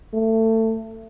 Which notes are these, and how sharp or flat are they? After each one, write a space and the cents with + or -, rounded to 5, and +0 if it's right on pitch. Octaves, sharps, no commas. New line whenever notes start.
A3 +25